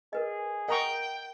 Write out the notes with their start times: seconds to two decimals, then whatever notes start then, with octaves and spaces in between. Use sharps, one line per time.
0.13 G#4 A#4 B4 D#5
0.68 A#4 D#5 F#5 G5 A#5 C#6